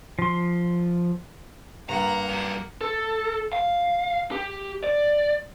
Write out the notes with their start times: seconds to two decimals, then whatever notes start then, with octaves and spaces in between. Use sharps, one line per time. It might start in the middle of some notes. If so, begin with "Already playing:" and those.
0.19 F3 C6
1.89 G2 A#3 F#5 A#5
2.29 F#2 D3
2.81 A4
3.53 F5
4.31 G4
4.84 D5